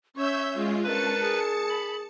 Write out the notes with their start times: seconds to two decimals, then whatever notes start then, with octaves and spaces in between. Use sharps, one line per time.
0.16 C#4 C#5 E5 E6 G6
0.53 G#3 F4
0.84 C#4 D4 A#4 B4 A5 C#7
1.20 G#4
1.69 B5